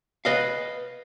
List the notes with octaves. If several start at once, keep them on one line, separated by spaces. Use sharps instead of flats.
B4 D#5 F5